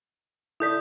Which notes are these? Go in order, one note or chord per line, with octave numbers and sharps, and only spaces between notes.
E4 A4 D5 D#6 G6 B6